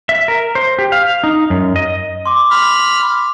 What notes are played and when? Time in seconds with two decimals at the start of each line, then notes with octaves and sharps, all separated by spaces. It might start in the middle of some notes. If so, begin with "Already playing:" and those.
0.09 E5
0.28 A#4
0.55 C5
0.79 G4
0.92 F5
1.24 D#4
1.50 F#2
1.76 D#5
2.26 C6 D6
2.51 B5 F6